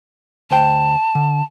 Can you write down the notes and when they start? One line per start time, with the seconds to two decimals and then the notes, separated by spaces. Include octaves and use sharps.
0.51 D2 C5 G5 A5
1.15 D3